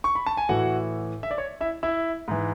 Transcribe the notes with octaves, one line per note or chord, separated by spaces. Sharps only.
C#6
B5
A5
G#5
A2 E3 F#4 F#5
E5
D5
C#5
E4 E5
E4 E5
G#2 E3